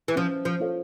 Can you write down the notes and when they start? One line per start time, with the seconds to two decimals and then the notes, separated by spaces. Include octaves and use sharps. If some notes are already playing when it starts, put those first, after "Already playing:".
0.08 E3
0.16 F3 C#4
0.45 F3
0.60 F4 A4 C#5 F5